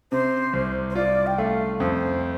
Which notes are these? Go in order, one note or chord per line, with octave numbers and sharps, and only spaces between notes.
C3 C5
C2
C5
F4 D5
G5
A3 F5
F2 C5